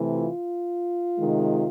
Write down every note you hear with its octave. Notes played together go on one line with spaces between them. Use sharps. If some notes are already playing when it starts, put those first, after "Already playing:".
Already playing: C3 E3 A3
F4
C3 D#3 G#3